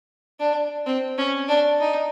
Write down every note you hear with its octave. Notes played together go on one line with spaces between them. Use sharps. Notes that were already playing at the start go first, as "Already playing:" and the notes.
D4
C4
C#4
D4
D#4